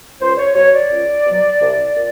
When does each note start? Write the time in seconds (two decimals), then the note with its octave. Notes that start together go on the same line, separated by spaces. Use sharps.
0.20 C#2 C5
0.37 C#5
0.55 B2 F#3 C#5
0.73 D5
0.90 C#2
1.25 B2 F#3
1.61 C2
1.96 A#2